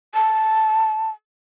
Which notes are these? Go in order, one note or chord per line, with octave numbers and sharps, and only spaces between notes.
A5